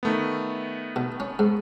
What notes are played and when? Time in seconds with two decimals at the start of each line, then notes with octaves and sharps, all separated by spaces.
0.03 D#3 A3 B3
0.96 B2
1.20 C#4
1.39 G#2